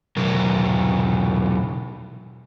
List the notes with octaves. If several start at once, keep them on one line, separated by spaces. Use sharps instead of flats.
E2 B2 F#3 A#4